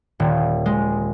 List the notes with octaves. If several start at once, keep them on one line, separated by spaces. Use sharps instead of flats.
D#1
G#3